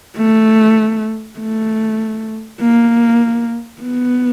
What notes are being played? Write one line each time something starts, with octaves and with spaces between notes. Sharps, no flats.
A3
A3
A#3
B3